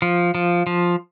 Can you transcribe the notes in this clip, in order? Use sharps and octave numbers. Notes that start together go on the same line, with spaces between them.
F3
F3
F3